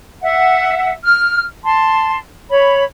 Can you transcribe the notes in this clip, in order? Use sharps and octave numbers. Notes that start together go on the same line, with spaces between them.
E5 F#5
F6
A5 C6
C#5 B5